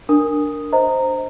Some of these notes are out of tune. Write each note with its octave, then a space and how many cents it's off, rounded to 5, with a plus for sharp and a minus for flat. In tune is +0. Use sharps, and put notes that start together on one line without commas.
D4 +0 A#4 -5 D#6 +0
C5 +0 D#5 +20 A#5 -15